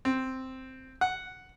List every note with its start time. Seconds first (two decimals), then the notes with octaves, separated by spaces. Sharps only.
0.05 C4
1.01 F#5